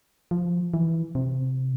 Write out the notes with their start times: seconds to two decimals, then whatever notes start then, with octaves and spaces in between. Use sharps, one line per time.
0.31 F3
0.74 E3
1.15 C3